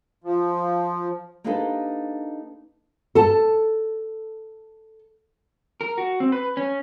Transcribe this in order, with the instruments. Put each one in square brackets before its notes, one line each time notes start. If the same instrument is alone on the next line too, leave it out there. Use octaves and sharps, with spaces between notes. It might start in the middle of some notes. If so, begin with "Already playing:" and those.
[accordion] F3
[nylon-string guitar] A#3 D4 D#4 G4 A4 B4
A4 A5
[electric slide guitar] A#4
F#4
C4
B4
C#4